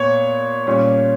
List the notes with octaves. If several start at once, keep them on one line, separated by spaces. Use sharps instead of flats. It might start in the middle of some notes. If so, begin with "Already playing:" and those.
Already playing: A#2 B3 C#5 C#6
A#2 G3 C#4